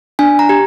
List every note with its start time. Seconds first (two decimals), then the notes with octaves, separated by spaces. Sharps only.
0.19 D4 G#5
0.39 A#5
0.49 G4